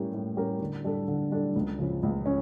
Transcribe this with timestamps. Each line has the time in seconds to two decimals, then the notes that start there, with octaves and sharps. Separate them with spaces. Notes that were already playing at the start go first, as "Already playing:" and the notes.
Already playing: A2 G3 C#4 G4 A#4
0.14 A2
0.36 G3 C#4 G4 A#4
0.61 D3
0.84 G3 D4 A4
1.08 D3
1.31 G3 D4 A4
1.56 C#2
1.79 C#3 F3 C#4
2.03 C#2
2.26 C#4